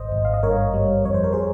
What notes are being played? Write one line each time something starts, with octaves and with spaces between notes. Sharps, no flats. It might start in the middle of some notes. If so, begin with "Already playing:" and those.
Already playing: G#1 C5 D#5
G#1
F5
D#5
G2 A#4 C#5
G3
F2 C#5
C5
A#4
G#4 C5